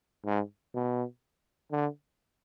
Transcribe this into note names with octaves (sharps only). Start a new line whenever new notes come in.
G#2
B2
D3